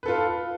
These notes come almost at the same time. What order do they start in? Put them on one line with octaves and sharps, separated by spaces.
B4 A4 F4